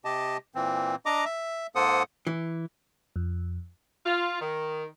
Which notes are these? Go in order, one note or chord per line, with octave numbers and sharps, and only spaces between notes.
C3 G4 D#5 A5
A#2 E3 C4
D4 D#5 A#5 D6
E5
G#2 A#3 A4 C5 F#5 D#6
E3
F2
F4
D#3